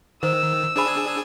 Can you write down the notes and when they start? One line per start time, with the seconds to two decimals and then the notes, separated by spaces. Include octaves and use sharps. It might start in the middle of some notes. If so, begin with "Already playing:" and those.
0.23 D#3 C5 E6
0.76 D4 G#4 C5 G#5 B5